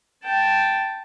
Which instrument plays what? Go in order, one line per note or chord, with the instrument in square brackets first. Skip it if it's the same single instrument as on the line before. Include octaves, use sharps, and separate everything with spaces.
[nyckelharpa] G5 A5